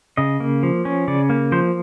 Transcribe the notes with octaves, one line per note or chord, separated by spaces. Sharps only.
C#3 D#5
A#3
F3
C#4
C#3 D5
A#3
F3 C5